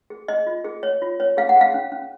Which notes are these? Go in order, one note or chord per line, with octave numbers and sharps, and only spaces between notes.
G#4
G#4 D#5
F4
G#4
C#5
F4
C#5
G#4 F5
F#5
G#4 F5
C#4
C#4